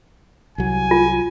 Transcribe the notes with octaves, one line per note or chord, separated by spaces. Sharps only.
C2 F#3 G#5
F4